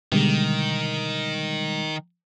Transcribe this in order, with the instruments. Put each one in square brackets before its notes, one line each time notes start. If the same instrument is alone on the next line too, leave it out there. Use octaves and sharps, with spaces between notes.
[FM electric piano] B2 G3 G#3 [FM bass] D3 [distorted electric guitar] D#3